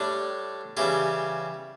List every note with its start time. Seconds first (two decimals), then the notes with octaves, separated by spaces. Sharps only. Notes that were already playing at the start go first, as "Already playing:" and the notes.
Already playing: A2 G3 D4
0.77 C#3 E3 G3 E4 G4